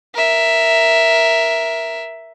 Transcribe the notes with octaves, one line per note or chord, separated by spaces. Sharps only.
A#4 E5